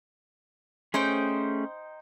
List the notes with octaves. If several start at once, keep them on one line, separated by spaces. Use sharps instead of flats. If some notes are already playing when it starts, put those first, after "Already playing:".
A3 C#4 D#4 G#4 C5 G5